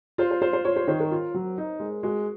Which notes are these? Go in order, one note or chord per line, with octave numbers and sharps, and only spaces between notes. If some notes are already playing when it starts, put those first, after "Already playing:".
F4 C5
C5
F4 C5
C5
F4 C#5
C5
D#3 C5
A#4
F4
F#3
D#4
G#3
G#3 F#4